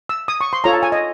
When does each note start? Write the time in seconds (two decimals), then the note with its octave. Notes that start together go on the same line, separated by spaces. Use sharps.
0.09 E6
0.28 D#6
0.41 C#6
0.53 C6
0.64 F4 A4 C#5 A#5
0.73 A5
0.83 G#5
0.92 D#5